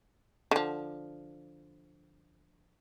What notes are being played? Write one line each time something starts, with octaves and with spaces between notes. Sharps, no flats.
D3 F3